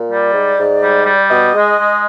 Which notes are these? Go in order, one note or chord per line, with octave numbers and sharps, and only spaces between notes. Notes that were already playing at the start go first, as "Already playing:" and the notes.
Already playing: A#2
G3 D5
G#2
G#2
G3
G3
B2 D#5
G#3
G#3